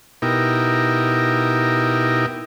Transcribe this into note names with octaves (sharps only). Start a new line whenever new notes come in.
B2 D#4 E4 G4 A#4